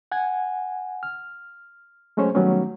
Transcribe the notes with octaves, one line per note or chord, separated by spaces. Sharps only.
F#5 G#5 G#6
F6
F#3 G#3 A3 C#4 C5 C#5
D#3 F#3 G3 A3 B3 C#4